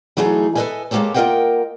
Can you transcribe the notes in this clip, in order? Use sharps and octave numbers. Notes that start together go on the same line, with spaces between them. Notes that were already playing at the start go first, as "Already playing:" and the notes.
E3 F#3 A3 D#4 G#4
A4 B4 C5 D#5 E5 G#5
G#3 A#3 C#4 G4 A4 C#5
A#3 F4 A#4 D#5 F#5 G5